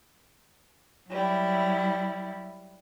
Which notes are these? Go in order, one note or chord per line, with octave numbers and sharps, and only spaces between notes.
F#3 G3 E4